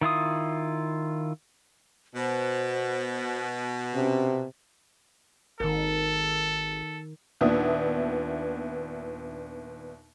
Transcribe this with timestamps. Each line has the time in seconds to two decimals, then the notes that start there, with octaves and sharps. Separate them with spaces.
0.01 D#3 E4 F4 D#6
2.15 B2 C5
3.94 C3 C#4
5.60 G#1 D#3 A4 A#4
7.41 D#2 A#2 B3 D4 E5 D#6